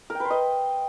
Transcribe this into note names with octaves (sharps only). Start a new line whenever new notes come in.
A#4
G5
B4
C6
D#5